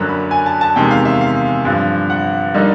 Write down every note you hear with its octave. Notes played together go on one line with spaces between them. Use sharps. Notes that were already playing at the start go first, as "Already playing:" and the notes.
Already playing: F#2 D3 F#3 A#3
B5
G#5
A5
A5
E2 C3 D#3 G#3 G5
F5
E5
F5
G2 D3 F3
F#5
D3 G3 A#3 D#4